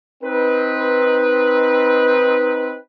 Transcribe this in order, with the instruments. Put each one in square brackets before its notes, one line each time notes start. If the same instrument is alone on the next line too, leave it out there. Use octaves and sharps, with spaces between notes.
[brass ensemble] C4 D#4 B4